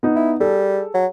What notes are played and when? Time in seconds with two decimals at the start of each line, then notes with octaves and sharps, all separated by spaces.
0.03 B3 D#4
0.15 E4
0.40 G3 G#4 A4
0.94 F#3